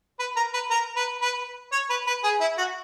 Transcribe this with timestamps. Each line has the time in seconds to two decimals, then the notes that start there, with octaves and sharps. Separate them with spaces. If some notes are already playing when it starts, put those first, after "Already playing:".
0.19 B4
0.36 A#4
0.53 B4
0.70 A#4
0.96 B4
1.22 B4
1.72 C#5
1.90 B4
2.07 B4
2.24 G#4
2.40 E4
2.58 F#4